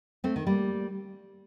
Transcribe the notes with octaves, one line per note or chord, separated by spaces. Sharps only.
A3 C4
D#3
G3 A#3